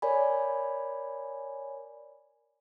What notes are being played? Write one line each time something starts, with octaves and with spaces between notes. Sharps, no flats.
A#4 C#5 D5 G#5 B5